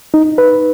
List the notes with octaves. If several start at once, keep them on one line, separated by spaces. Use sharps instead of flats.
D#4
B4